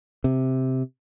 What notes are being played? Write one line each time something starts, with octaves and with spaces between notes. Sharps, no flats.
C3